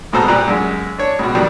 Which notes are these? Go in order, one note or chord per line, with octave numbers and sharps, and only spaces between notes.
C2 G#2 B2 A4 C5 A#5
A#2 G3 A#5 F#6
F#2 G#3
D4 C#5
C#2 B2
F2 D#3 F#3 G3